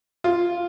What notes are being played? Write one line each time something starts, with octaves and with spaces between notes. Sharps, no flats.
F4